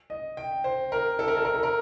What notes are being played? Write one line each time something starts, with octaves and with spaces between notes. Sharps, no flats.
D#5
G5
C5
A#4
A4
A#4
A4
A#4
A4
A#4